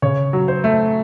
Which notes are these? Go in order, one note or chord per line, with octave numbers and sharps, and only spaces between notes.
C#3 C#5
F#3
C5
A3